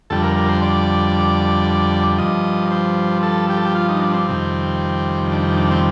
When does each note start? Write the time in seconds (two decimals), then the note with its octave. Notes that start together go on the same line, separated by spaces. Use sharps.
0.10 F2 D3 G3 A4
0.23 A#4
0.37 A#4
0.49 C5
0.62 D5
2.18 G2 F3 D#5
2.71 C5
3.23 A4
3.50 G4
3.57 A4
3.65 G4
3.75 F4
3.89 D#4
4.01 D4
4.14 C4
4.28 F2 C3 D#3 G3
5.31 D4
5.57 D4
5.71 C4